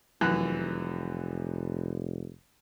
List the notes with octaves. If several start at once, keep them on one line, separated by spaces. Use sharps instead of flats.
F1 F#2 E3 F#6